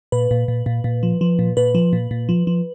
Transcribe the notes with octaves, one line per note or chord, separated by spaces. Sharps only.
A#2 B4
A#2
A#2
A#2
A#2
F3
F3
A#2
A#2 B4
F3
A#2
A#2
F3
F3